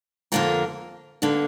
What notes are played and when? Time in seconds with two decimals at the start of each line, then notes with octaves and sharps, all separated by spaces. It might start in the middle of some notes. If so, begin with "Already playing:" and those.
0.32 F2 D3 A#3 F4 A#4
1.22 G2 D3 A#3